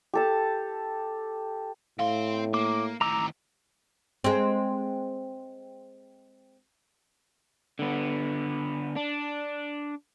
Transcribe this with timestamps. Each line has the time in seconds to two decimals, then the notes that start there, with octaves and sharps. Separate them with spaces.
0.14 G4 A4 A5
1.99 A2 C4 F5 C6
2.54 A#3 D6
3.01 A2 D#3 A#5 D6 E6
4.24 G#3 C4
7.79 D3 B3
8.96 D4